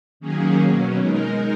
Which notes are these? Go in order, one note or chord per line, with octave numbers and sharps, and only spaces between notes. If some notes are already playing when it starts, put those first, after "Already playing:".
D#3 F#3 A#3 C#4 G#4
B2 F#3 C#4
G#3 D#4 A#4